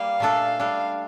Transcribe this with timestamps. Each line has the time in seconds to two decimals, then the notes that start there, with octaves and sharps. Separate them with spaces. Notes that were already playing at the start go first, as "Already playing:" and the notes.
Already playing: G3 A#3 F5
0.20 A#2 A3 D4 A4
0.59 G3 D4 A4